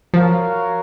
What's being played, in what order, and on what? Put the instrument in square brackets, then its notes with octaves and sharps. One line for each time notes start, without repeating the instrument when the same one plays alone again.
[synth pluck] F3 [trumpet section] F#4 A#4 C#5 F5